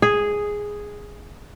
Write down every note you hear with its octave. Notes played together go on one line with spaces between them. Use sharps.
G#4